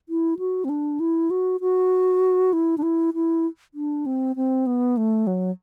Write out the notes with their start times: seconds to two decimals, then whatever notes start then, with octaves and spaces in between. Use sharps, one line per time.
0.09 E4
0.39 F#4
0.64 C4
0.69 D4
1.00 E4
1.30 F#4
1.61 F#4
2.53 E4
2.78 D4
2.83 E4
3.14 E4
3.74 D4
4.06 C4
4.36 C4
4.66 B3
4.97 A3
5.27 F#3